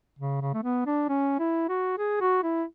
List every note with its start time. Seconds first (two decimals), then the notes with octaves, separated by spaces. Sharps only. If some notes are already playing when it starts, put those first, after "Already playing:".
0.19 C#3
0.41 C#3
0.54 A3
0.63 B3
0.86 D4
1.09 C#4
1.39 E4
1.69 F#4
1.98 G#4
2.21 F#4
2.43 E4